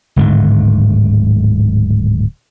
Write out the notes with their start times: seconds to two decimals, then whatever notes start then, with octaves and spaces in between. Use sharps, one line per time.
0.16 D1 G#2 D3 D#3